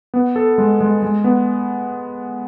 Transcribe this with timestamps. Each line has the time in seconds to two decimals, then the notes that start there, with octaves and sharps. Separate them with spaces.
0.14 B3
0.36 A4
0.58 G#3
0.81 G#3
1.02 G#3
1.24 B3